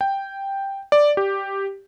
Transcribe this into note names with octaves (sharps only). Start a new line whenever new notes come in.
G5
D5
G4